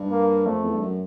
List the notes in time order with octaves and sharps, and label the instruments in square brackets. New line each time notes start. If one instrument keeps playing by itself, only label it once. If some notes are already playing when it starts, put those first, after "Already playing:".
Already playing: [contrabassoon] G2
[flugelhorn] A#3
[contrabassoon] F2 [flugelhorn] A3
[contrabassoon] E2
G2
F#2